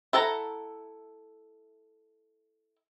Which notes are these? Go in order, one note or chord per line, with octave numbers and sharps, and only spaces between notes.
E4 A4 F#5 A5 A#5